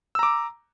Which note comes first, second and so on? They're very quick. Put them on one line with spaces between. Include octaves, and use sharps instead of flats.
E6 A#5 D6